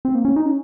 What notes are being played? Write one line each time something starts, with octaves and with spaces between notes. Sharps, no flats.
C4
A#3
C#4
D#4
C#4